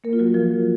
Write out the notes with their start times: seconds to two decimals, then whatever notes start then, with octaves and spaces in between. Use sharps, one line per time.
0.04 A#3 A#4
0.13 F4
0.19 F#3 F#4
0.34 F3 F4